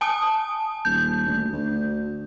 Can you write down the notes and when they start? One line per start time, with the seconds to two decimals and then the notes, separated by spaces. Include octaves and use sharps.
0.01 G#5 A5 D#6
0.85 D#1 G6
1.26 D2
1.53 D2